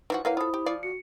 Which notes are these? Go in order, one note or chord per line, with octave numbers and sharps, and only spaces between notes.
E3 F3 D#4 F#4
A#3 E4 B4 C#5 F5 F#5 F6
F4 A4 C5 B5 D#6
G4
F3 D5 F5
F#4 C#7